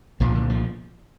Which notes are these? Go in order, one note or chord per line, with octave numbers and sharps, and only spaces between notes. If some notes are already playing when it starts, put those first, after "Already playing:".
C2 A#2 F3
D3
F3